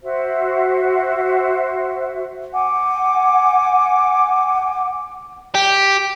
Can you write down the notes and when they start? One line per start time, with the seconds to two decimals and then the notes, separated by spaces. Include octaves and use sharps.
0.03 F#4 C5 E5
2.52 F#5 G#5 D6
5.55 G4